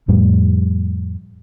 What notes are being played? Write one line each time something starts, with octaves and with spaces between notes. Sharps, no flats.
F2 A2 G3